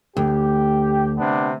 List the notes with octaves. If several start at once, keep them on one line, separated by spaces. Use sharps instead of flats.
D2 G4
C3 B3 D4